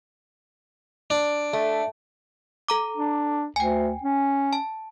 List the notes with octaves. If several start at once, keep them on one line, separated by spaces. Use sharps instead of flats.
D4
A3
A4 A#5 D6
D4
D2 G5 G#5
C#4
A5